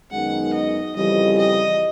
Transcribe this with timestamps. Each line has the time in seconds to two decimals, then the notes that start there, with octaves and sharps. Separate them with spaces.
0.11 F#2 D#3 G#3 B3 D#4 F#5
0.53 D#5
0.95 F2 C#3 E3 G3 D#5
1.38 D#5